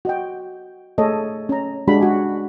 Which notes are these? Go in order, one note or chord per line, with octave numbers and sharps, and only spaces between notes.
F#4 D#5 G5
A3 G#4 A4 C#5 D#5
C#4 A#5
G#3 D4 F#4 G4 B5
F#4 G#5